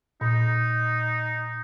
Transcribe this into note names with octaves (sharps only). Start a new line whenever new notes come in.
A#2 D#4